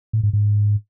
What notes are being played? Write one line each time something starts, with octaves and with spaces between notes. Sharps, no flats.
A2
G#2
G#2